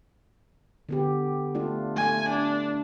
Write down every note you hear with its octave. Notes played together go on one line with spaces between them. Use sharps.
D3 B3 G4
A3 D4 F4
A3 G#5
D4